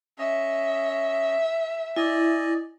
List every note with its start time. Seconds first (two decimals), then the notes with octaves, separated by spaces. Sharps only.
0.18 C#4 D#5 E5
1.96 E4 D5 D#5 G#5